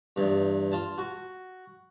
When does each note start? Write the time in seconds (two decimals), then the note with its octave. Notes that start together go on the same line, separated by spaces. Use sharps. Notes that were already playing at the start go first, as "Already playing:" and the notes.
0.16 E2 G2
0.72 F4 A5
0.98 F#4